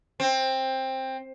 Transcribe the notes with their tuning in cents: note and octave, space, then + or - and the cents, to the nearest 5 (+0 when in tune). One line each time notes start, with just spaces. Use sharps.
C4 +15